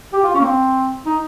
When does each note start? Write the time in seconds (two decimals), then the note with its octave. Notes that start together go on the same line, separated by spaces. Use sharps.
0.13 G4
0.23 F4
0.34 C#4
0.40 A#3
0.44 C4
1.06 D#4